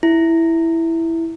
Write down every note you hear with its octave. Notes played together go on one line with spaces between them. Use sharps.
E4